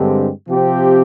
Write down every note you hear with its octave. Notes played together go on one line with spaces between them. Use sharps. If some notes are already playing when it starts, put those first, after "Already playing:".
Already playing: G2 D3 G#3 C4 G4
C3 F3 C4 G4